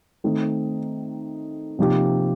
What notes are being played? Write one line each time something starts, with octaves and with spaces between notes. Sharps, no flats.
D#3 A3 C4 D#4
C3 F3 A#3 D#4 G4